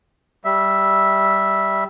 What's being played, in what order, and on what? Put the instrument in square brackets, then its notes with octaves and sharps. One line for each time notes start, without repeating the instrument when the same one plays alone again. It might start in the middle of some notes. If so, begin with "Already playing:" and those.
[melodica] G3 E5